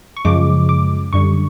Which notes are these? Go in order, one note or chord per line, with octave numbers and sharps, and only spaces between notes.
C#6
F#2 C#3 F3 G#3 D6
D6
F#2 D3 G3 C#6